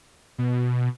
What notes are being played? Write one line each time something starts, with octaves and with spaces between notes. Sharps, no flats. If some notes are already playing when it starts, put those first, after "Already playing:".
B2